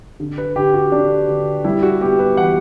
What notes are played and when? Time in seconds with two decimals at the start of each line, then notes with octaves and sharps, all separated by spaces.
0.20 D3
0.38 B4
0.56 D3 G4
0.74 F#4
0.92 D3 D4
1.29 D3
1.64 G3 E4
1.83 F#4
2.01 B3 G4
2.19 B4
2.37 E3 F#5